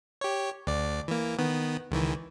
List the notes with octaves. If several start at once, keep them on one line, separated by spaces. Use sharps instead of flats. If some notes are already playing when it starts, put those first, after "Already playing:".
G4 C#5
D2 D5
E3 A#3
D#3 B3
C#2 D#3 E3